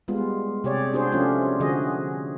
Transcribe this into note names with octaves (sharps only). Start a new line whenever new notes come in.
G3 G#3 B3 F4
C3 G4 G#4 C#5 D5
D4 F#4 G#4 C5
F3 A3 C#4 D4 F4 G4
D3 F3 F#4 G#4 D#5